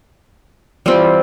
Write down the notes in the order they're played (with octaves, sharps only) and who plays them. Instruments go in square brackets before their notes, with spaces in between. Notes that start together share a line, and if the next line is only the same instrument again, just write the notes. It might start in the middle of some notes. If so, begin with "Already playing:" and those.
[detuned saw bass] E3 [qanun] G3 C4 F4